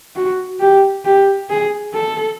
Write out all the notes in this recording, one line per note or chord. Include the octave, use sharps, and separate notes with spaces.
F#4
G4
G4
G#4
A4